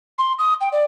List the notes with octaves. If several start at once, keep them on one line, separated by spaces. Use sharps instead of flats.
C6
D#6
G5
D5